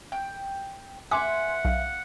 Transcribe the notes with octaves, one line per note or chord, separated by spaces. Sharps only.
G5
B4 E5 F#5 G#5 C6 D6
B1 F5